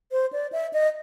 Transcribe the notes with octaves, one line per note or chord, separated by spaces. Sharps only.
C5
D5
E5
D#5